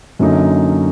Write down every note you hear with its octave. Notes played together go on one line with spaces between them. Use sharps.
F#2 D3 F#3 A#3 D#4